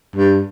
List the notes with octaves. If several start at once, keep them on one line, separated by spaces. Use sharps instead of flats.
G2